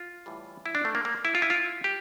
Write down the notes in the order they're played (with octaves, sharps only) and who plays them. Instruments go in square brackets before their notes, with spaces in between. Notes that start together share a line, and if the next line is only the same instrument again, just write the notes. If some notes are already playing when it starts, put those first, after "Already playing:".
Already playing: [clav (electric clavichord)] F4
A2 E3 G3
E4
D4
A3
A#3
A#3
E4
F4
E4
F4
G4